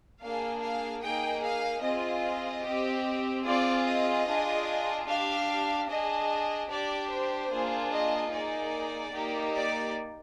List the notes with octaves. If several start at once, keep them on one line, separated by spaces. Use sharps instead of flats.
A#3 D4 G#4 F5
F5
A#3 D#4 G#4 G5
F5
C4 F4 G#4 D#5
C4 G4
C4 F4 G#4 D5
D#5
D4 F4 G#4
D4 G4 F5
D4 G#4 D#5
D4 G4 D5
C5
A#3 D4 F4 G#4
D#5
A#3 D#4 G#4 D5
A#3 D#4 G4
D5